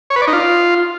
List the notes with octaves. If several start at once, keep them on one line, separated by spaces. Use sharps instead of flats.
C#5
B4
D5
D#4
F4